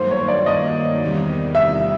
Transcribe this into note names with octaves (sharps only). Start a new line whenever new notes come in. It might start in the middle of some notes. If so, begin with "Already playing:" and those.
Already playing: G2 D#3 F#3 A#3 C5
C#5
D5
D#5
E2 C3 D#3 G3
E5